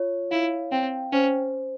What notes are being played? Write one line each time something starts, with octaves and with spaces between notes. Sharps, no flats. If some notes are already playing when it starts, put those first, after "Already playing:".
Already playing: F4 C#5
E4 F5
C4 G5
C#4 C5